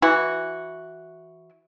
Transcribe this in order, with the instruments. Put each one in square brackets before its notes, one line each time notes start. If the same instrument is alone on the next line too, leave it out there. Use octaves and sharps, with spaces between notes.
[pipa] E3 E4 F#4